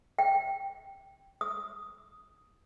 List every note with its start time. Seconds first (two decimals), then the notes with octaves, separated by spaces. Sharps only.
0.19 G5
1.41 D#6